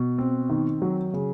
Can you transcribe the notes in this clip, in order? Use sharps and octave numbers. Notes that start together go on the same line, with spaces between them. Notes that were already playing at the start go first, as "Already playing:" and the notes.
Already playing: B2
C4
D#3
F#3
C#3